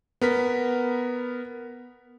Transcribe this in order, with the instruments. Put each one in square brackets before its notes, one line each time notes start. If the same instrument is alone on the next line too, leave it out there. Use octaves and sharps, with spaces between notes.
[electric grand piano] B3 A#4 B6